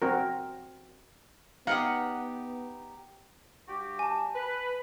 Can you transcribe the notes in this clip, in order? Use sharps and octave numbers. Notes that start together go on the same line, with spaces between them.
C4 F#4 A#4
B3 D#4 G4 F5 F#5 D#6
G2 F#4 G4
G#5 A5
B4